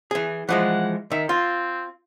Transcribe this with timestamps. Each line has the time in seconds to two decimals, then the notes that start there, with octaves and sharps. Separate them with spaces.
0.11 E3 G#4
0.49 E3 F3 G#3 F#5
1.12 D#3 E5
1.29 C4 F4